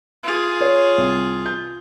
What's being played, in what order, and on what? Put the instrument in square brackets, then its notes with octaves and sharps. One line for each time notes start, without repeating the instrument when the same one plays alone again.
[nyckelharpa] F4 G#4
[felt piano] C#5
C2
G6